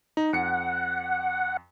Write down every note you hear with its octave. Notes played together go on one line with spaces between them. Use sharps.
D#4
F2 F#5 C#7